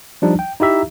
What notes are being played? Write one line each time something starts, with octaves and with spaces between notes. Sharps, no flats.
F3 G3 D4 D#4
G5
D#4 E4 G4 E5 A#5